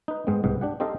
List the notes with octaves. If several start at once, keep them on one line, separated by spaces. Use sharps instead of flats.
D#4 B4
G#2 G#3 B3 C4
C2 G#2 B3
D4 G4 F#5
C4 D#4 G4 A4 D#5 F5